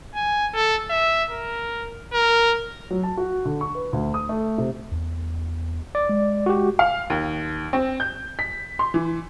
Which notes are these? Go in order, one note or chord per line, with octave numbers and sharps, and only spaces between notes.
G#5
A4
E5
A#4
A#4
F#3
A5
F#4
D3
C#6
B4
D2
D#6
A3
C3
E2
D5
G#3
F#4 G4
F5
D#2
C4
G6
B6
C6
E3